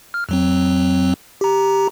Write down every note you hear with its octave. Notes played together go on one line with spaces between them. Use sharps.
F6
F2 F#3 C4
G4 A#5